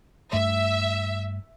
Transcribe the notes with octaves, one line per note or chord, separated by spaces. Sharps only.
G2 A3 E5